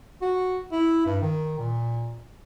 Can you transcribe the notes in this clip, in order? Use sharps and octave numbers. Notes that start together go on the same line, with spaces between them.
F#4
E4
G2
D#3
A#2